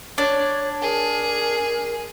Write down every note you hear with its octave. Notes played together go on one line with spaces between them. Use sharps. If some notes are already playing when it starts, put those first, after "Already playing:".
D4 C#5
G#4 A#4